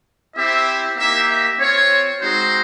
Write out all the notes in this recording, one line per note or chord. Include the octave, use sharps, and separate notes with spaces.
C4 E4 G4 E5
A#3 D#4 G4 E5
E5
C4 F4 C#5
G#3 C4 D#4 F#4 C5